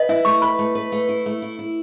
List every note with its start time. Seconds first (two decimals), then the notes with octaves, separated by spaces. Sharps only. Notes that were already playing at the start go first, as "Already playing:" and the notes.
Already playing: B4 D#5
0.09 E4 E5
0.25 A3 C#6
0.42 B4 B5
0.59 A3
0.75 B4
0.92 A3
1.09 E4
1.26 A3
1.42 E4
1.59 E4